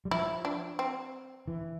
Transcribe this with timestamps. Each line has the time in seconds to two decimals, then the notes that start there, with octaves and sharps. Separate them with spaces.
0.05 G3
0.11 F3 E4
0.45 D4
0.79 C4
1.48 E3